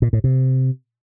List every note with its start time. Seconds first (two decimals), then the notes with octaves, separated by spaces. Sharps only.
0.02 A#2
0.13 A2
0.24 C3